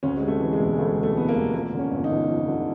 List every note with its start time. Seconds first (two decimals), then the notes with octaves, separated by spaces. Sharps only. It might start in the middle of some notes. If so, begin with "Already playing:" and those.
0.03 D2 C#4
0.17 C3 G#3
0.28 A3
0.41 E3
0.53 G#3
0.60 E1
0.78 D2 A3
0.97 C3
1.03 A3
1.16 E3 B3
1.28 A#3
1.35 E1
1.54 F2 A#3
1.73 D3
1.79 C#4
1.92 G1
2.04 D#4
2.11 G1
2.29 F2
2.48 D3